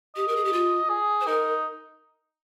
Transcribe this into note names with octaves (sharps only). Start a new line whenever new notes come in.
G4 D#5
A#4
G#4
G4
F4
G#4
C5
D#4 A#4